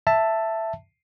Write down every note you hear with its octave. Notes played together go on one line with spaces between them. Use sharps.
E5 A5